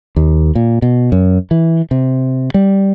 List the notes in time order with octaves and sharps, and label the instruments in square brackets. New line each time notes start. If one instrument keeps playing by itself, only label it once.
[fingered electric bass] D#2
A#2
B2
F#2
E3
C3
G3